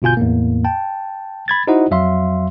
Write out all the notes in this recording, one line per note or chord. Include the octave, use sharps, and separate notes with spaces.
G1 B2 F4 G#5 G6
E2 A2 A#3
G5 A5
B5 G#6 A6
D#4 E4 F#4 C5 D#5 F#5
F2 F#3 E5 F5 C6